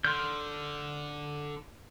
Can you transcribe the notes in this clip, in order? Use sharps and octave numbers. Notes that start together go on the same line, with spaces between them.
D3 C6 F6 G6